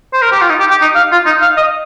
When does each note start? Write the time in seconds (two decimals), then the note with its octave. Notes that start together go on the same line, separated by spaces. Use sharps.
0.13 C5
0.22 A#4
0.32 G4
0.42 F4
0.50 D#4
0.60 G4
0.71 G4
0.81 D#4
0.95 F5
1.12 F4
1.26 D#4
1.42 F5
1.57 D#5